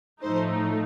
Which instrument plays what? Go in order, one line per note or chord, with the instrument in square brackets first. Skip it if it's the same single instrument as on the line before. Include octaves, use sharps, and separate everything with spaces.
[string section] A2 F3 A3 D#4 C5